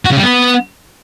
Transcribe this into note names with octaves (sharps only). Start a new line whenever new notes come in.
F#4
C#3
G3
B3